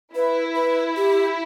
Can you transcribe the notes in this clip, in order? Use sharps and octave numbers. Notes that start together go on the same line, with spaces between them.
E4 B4
B4
G4